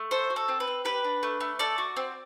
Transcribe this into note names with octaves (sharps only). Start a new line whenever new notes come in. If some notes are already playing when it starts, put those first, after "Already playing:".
Already playing: A3
A4 C5
F#4
A4
C4
B4
C4
G4 B4
D4
A3
A3
A4 D5
F#4
C4